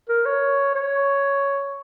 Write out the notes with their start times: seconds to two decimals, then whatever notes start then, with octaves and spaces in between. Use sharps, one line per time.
0.09 A#4
0.25 C#5
0.75 C#5